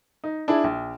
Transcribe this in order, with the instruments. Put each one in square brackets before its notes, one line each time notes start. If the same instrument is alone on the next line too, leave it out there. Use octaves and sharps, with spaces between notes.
[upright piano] D#4
D4 E4 G#4
A#1